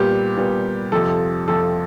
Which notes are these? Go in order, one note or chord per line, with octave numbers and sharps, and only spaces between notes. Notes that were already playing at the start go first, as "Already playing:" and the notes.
Already playing: A#2 G3 B3 G4
A#2 G3 B3
F2 C3 F3 A4
F2 C3 F3 A4